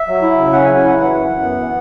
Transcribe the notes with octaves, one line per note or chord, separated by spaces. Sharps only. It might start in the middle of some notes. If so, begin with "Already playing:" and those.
Already playing: E5
F#3
E4
C#3
C#4 F#5
G#5
F#3
G#5
E4 F#5
E3 F#5
F#2
F#2
B3
E3